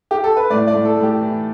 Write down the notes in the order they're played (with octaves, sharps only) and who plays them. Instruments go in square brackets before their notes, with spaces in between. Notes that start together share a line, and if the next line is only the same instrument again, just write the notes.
[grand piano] G4
A4
B4
A2 D5
D5
A2
A4
A2
G4
E3